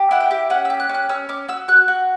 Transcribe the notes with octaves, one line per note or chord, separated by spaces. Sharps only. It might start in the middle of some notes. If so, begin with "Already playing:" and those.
Already playing: G4
E4 F#5
G5
G4
C#4 F#5
E6
G4
F#6
C#4
F#6
C#4 E6
C#4 D6
F#4 E6
F#4 F#6
F#4